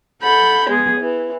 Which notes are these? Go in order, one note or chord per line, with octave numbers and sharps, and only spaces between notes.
A4 F#5 B5 G6
G#3 B3 G#4
E3